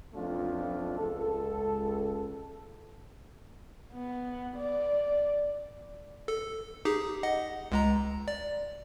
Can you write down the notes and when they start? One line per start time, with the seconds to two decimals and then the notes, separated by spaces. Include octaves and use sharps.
0.14 B1 F2 A3 D4 F4
0.98 C#2 A4
3.93 B3
4.57 D5
6.28 A4
6.85 D#4 G4 G#4
7.23 D#5 F#5
7.72 C#2 G#3 A#5
8.28 D5